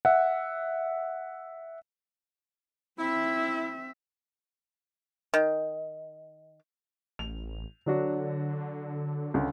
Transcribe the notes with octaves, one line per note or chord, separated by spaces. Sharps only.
E5 F#5
C4 E4 E5
D#3
A1 F7
D3 F#3 D4 F#4
C#2 D3